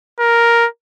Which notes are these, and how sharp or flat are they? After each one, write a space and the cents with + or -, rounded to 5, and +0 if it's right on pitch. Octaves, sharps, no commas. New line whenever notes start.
A#4 +5